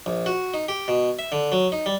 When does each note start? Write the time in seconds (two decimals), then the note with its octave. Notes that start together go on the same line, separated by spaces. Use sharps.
0.06 A#1
0.26 F#4
0.54 D#4
0.69 G4
0.88 B2
1.19 E5
1.32 D3
1.52 F#3
1.72 D#4
1.86 G3